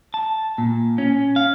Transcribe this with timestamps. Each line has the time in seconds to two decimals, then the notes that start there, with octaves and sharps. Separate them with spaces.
0.14 A5
0.58 A#2
0.98 C#4
1.36 F5